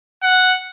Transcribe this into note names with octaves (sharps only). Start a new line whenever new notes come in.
F#5